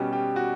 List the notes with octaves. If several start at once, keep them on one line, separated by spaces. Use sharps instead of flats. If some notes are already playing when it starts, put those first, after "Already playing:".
Already playing: B2 G3 C#4 G4
G4
F#4